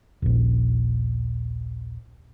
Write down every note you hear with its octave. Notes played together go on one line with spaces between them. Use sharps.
D#1 A#1